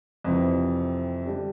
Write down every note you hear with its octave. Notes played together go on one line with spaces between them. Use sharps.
F2 C3 E3
D3 G3 D4 G4